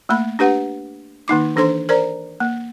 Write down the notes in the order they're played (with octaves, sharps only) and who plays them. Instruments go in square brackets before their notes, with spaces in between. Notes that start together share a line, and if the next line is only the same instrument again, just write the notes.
[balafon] A3 A#3 B5
D4 G4 B4 F#5
D#3 A#3 D#4 D6
E3 D4 A4 C5 C6
A#4 C5 D5 A#5
A#3